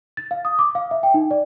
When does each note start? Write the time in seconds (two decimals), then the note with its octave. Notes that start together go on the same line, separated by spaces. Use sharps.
0.17 A6
0.31 F5
0.45 D#6
0.59 D6
0.75 F5
0.91 E5
1.03 G5
1.14 D#4
1.31 D5